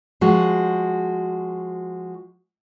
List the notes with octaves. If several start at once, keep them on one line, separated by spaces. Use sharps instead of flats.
F3 G#3 F#4